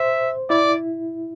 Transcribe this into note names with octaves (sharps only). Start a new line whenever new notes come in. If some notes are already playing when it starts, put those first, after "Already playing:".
Already playing: C5 E5
E4 D5